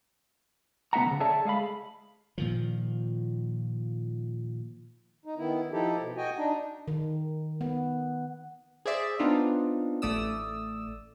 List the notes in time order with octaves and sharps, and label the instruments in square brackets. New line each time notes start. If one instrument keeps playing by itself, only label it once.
[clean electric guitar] C2 B3 D#4 E5 F#5 A#5
C#3 E3
G#4 A4 C#5 D5 E5 A5
G#3 G#4 F5 B5
[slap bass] A#2 D#3 F3
[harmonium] D#4
D#3 B3 E4
F3 D#4 E4 G4 A4
B2
F#4 D#5 G5 G#5
D4 D#4
[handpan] D#3
B3
[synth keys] G#4 C5 D5 E5
B3 C4 D4 D#4 F4
A1 A3 D5 D#6 E6